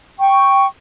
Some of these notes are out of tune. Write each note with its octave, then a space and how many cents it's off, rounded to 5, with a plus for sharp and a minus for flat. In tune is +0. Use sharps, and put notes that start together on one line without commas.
G5 +0 C#6 +0